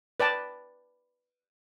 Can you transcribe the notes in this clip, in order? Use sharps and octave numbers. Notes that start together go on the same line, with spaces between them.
B4 D5 G5 A5